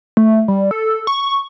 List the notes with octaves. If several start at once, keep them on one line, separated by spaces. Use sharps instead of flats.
A3
G3
A4
C#6